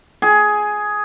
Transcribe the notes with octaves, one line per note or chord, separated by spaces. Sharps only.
G#4